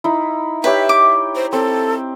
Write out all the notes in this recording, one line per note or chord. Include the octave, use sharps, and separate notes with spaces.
D#4 E4
G4 B4 C#5 E5 G5
D6
C5
C4 A4